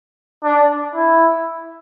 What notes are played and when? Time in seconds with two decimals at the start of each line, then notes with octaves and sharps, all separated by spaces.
0.44 D4
0.95 E4